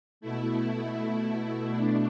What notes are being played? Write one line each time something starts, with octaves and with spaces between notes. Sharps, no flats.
B2 A3 E4
D4